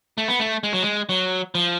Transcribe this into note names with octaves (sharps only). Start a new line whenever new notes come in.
A3
B3
A3
G#3
F#3
G#3
F#3
F3